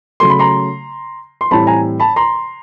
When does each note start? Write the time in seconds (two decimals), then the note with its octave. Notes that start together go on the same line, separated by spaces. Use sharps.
0.20 C#3 F#3 A3 C6
0.30 B5
0.39 A#5 C6
1.41 C6
1.51 A2 E3 G3 C4 A5 B5
1.67 G#5 A#5
2.00 A5 B5
2.16 A#5 C6